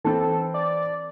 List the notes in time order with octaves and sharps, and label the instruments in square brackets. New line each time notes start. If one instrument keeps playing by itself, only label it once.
[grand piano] E3 C4 [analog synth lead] A4
[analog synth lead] D5